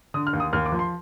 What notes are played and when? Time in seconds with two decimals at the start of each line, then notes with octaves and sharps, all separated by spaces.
0.14 D3 D#6
0.27 F6
0.33 D#2
0.40 D#6
0.53 D#2 F6
0.66 D6
0.72 F3
0.79 C6